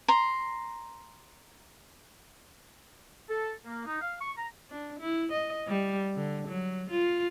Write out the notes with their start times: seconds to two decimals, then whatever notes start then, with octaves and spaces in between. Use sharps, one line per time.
0.08 A#5 C6
3.29 A4
3.64 A#3
3.86 D#4
4.00 F5
4.21 C#6
4.37 A#5
4.70 D4
5.00 E4
5.32 D#5
5.68 G3
6.16 D3
6.48 F#3
6.90 F4